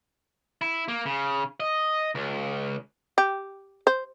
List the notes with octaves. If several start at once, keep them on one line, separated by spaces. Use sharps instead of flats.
E4
A#3
C#3
D#5
C#2
G4
C5